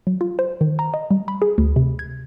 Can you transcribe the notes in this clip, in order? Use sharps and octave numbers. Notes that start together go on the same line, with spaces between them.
F#3
F4
C5
D#3
A#5
D#5
G3
B5
G#4
D2
C3
G#6